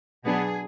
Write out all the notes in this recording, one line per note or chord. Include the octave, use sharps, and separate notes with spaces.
B2 F#3 B3 D4 G#4